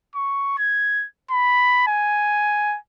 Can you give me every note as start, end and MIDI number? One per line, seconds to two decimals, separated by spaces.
0.15 0.54 85
0.58 1.06 92
1.31 1.86 83
1.88 2.77 80